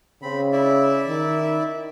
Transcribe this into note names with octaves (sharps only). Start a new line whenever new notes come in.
C#3 C4 B5
E4 D5 E5
D#3